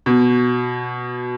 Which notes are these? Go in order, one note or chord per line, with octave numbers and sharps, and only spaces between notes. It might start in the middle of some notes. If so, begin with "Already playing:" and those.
B2